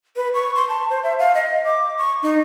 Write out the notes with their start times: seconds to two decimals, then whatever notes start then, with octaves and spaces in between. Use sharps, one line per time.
0.17 B4
0.34 C#6
0.55 C6
0.69 A5
0.90 C5
1.03 E5
1.19 F5
1.35 D#5
1.65 D6
1.98 C#6
2.23 D#4